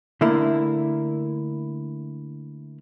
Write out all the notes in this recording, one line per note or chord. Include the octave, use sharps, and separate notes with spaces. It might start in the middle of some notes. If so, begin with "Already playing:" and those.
D3 A3 A#3 E4